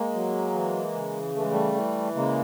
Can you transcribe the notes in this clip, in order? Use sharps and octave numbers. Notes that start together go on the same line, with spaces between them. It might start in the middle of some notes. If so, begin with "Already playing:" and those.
Already playing: G#3 A#3
F#3
E3
C#3
E3 A3
G#3
G3 A3
E3
C#3 G#3 A#3